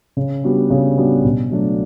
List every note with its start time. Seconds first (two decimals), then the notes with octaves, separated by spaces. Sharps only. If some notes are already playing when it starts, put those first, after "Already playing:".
0.17 C#3
0.44 G3 B3 D4 F#4
0.70 C#3
0.98 G3 B3 D4 F#4
1.24 B2
1.51 F#3 A3 D4